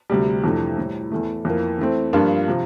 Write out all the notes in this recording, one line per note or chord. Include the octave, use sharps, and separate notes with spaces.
D2 C3 G3
F2 C3 E3 A3 D4
A2 E3 G3
E2 E3 A3
F2 E3 A#3
E3 A3 C4
G2 F3 A#3 D4 F4
C3 F3